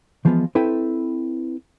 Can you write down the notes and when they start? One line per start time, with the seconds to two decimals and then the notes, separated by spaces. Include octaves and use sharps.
0.25 E3 F3 G#3 B3 F4
0.55 C4 E4 A4 B4 G5